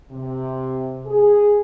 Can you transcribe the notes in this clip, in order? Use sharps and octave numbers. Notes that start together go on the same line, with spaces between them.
C3
G#4